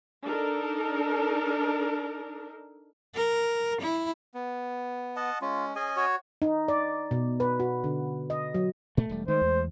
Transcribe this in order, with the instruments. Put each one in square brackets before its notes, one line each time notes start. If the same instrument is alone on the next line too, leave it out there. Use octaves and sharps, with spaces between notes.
[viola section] D4 D#4 A4 A#4
[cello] A#4
E4
[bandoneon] B3
[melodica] D#5 F#5 A5
[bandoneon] G#3 C#4 [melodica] F4
[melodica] C#4 D#5 G#5 [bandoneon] G#4
[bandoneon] F#4 C#5
[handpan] D#4
D5
B2
B4
F#4
D3
D#5
F#3
[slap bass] A#2 [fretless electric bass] A3
[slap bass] E1 G3
[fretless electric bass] D#3 [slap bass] G#3 A3 [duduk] C5
[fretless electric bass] E2